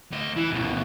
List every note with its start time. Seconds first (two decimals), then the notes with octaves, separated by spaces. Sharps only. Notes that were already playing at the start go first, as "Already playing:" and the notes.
0.12 D2 D#5
0.37 E3
0.51 D2 B2